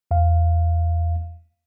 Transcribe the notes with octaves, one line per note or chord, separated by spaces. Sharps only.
E2 F5